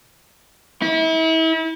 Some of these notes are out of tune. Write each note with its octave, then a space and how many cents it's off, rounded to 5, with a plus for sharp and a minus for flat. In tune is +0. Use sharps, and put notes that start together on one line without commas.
E4 -35